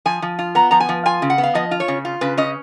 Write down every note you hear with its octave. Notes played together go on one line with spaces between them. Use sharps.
F3 G#5
F3
F4
B3 A#5
F3 A#5
G#5
F3
F4 G#5
C#3
F#5
B3
F5
F3 D#5
F4
C#5
C#3
F4
C#3 B4
C#4 D#5